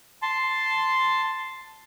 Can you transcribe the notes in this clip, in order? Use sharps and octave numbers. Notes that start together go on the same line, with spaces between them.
A5 C6